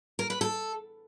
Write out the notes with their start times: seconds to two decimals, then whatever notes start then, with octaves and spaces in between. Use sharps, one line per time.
0.19 A#4
0.30 B4
0.41 A4